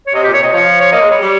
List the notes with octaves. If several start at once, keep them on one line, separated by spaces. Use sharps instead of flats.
C#5
C3 D#5
A#2 G4
C#5
C3 D#5
F3 C#5
C#5
A#3 D#5
G#3
G3 C#5
G3